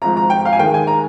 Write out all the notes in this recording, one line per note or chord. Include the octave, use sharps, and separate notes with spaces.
G#1 G#2 F3 A#5
A#5
G5
F5
G#5
D#2 D#3 G#3 G5
G#5
A#5